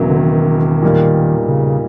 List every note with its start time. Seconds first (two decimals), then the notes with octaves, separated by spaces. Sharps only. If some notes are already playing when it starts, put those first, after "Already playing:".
Already playing: E1 E2 C#3 F#3 A#3
0.10 D3
0.18 D#3
0.82 A#2 G3 A#3 D#4
1.48 C#3